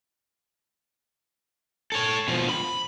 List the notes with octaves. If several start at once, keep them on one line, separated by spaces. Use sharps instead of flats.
A4 C#5
B2 F3
B5